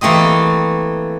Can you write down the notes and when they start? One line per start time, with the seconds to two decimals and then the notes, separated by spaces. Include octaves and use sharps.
0.01 E3 A3 A#3 C4 D#5